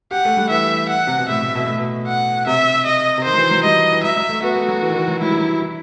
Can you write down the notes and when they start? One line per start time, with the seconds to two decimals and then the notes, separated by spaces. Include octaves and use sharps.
0.11 G4 F#5
0.25 A3
0.37 G3
0.50 E3 E5
0.89 F#5
1.07 C3
1.18 B2
1.29 A2 E5
1.42 A2
1.55 B2
1.66 A2
1.78 B2
2.08 F#5
2.47 C3 E5
2.86 D#5
3.18 C3
3.25 D#3 C5
3.34 F#3
3.38 E3
3.51 F#3
3.64 G3 D#5
3.92 E3
4.04 F#3 E5
4.17 F#3
4.29 A3
4.43 B3 F#4
4.56 A3
4.68 F#3
4.82 E3
4.89 D#3
4.95 E3
5.08 F#3
5.21 F#3 E4
5.29 G3
5.37 F#3
5.60 E4